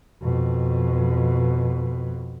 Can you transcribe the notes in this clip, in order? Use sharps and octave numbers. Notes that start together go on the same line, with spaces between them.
F2 B2